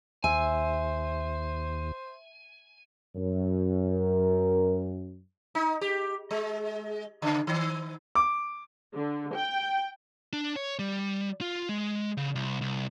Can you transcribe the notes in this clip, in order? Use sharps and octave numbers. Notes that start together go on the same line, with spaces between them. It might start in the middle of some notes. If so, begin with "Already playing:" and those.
D#2 C5 E5 G#5
F#2
A#4
D#4
G4
G#3
C#3
D#3
D6
D3
G5
D4
C#5
G3
F4
G#3
C#3
C2
C2